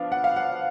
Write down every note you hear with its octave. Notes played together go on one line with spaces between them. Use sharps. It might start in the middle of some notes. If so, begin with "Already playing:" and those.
Already playing: F3 B3 D4 F5
F#5
F5
F#5